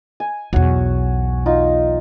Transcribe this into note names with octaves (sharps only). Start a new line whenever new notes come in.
G#5
B1 E2 F#4 C#5
D#4 F4